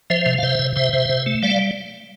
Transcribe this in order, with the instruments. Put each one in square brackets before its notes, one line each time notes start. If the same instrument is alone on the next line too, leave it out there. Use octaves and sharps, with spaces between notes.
[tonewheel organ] F3 C5 E5
C3
F5
C3 C5 E5
C3
C3 C5 E5
C3
C3
A3
G3 D5 F5